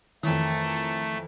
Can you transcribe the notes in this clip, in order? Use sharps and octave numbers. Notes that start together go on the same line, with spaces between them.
F2 D#3 E3 A3 A4 A#4